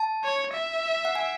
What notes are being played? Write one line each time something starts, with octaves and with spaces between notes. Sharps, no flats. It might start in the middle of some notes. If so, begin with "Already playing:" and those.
Already playing: A5
C#5
E5
F#5
G#5